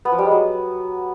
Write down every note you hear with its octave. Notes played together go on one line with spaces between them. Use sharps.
B3
F3
G3
G#3
F#3